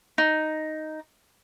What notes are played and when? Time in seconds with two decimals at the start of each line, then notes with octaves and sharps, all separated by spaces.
0.18 D#4